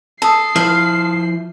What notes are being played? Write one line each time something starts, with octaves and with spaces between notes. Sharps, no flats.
A4 A5 D#6 C7
F3 E4 C5 F5